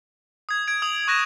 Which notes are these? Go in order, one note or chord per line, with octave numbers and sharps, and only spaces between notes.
D#6 G#6
G#6 D7
D#6 F7 F#7
C#6 F#6 A#6 D#7 E7